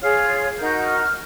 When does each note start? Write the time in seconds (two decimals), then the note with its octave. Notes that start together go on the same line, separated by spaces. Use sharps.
0.01 F4 G#4 C#5
0.58 D#4 F#4 A#4 G6
0.87 F6